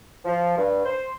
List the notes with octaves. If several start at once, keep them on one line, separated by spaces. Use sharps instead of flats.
F3
G2
C5